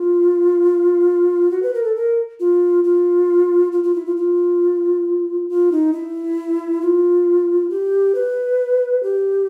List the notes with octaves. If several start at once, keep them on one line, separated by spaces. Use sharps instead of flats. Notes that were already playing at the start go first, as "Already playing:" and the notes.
Already playing: F4
F#4
B4
A#4
A4
A#4
F4
F4
F4
F4
E4
F4
F4
F4
D#4
E4
F4
G4
B4
G4